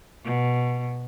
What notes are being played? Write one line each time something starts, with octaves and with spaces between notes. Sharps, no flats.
B2